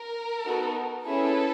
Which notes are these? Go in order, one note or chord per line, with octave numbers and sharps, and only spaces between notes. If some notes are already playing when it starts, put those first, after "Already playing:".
Already playing: A#4
B3 D#4 F#4 A4
C#4 E4 G#4 A4 B4